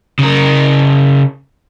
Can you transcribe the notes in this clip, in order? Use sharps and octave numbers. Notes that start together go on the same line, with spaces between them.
C#3 A#4